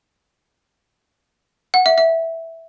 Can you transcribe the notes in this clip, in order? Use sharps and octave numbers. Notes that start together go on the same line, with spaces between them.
F#5
E5
E5